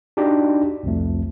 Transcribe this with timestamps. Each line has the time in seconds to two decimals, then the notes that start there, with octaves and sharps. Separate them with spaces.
0.17 D4 D#4 F#4 G4 D5
0.83 C2 F2 A3